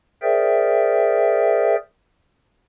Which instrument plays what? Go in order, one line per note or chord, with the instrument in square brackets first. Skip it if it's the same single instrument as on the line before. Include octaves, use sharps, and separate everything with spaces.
[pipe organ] G#4 A#4 C5 D5 E5 G5